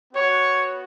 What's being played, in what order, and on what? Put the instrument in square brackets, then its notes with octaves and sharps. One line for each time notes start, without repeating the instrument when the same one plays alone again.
[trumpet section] B3 F#4 C#5